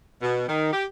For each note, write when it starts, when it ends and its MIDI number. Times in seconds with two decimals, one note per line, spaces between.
0.22 0.47 47
0.48 0.69 51
0.73 0.85 67